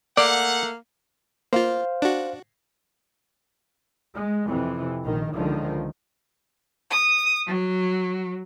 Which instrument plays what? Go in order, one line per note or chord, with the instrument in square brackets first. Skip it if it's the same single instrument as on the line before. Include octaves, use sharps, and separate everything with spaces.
[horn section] A3 F#5 [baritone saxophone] A#3 [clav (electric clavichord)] D5
[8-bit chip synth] A#3 F4 [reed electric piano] C5 F5
[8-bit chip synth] D4 F#4
[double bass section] G#3
F2 C3 E3
A#1 D#3
C#2 D3 D#3 F3
[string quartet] D#6
F#3